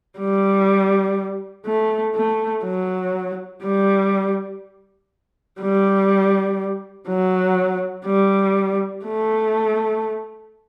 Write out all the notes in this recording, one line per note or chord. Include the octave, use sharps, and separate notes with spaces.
G3
A3
A3
F#3
G3
G3
F#3
G3
A3